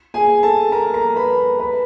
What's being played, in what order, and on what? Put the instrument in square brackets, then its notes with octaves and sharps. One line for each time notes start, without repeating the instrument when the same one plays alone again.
[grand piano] G#4 G#5
A4 A5
A#4 A#5
A#4 A#5
B4 B5
B4 B5